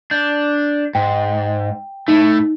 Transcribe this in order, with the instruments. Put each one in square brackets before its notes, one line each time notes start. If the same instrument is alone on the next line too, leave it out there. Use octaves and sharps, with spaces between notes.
[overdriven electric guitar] D4 [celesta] G6
[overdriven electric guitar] G#2 [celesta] G5
[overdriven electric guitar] A2 A3 [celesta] D#4